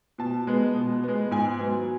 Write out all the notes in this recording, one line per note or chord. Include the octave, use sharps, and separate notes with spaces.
B2 A5
G#3 B3
B2
G#3 B3
G#2 G#5
F#3 B3